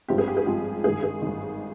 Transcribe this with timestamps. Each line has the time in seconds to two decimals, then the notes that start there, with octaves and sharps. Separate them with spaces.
0.08 G#1 G2 F3 G#3 C4 G4
0.18 G#4
0.28 G4
0.37 G#4
0.46 G#1 G2 F3 G#3 C4 G4
0.84 G#1 G2 D#3 G#4
1.03 G#4
1.22 G#1 G2 D#3